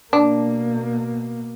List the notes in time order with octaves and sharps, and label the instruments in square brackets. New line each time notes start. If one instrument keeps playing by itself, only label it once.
[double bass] B2 A#3 [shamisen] D4